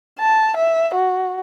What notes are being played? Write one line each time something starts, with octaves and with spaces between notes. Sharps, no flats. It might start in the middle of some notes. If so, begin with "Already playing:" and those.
A5
E5
F#4